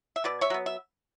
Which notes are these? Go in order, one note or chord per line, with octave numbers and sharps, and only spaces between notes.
E5
B2 B4 D5
C#5 E5
F#3 B3
E5